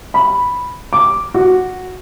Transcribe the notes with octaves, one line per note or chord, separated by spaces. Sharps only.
B5
D6
F#4